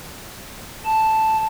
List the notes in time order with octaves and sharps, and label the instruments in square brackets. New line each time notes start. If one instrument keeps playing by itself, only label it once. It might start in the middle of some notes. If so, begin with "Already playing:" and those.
[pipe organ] A5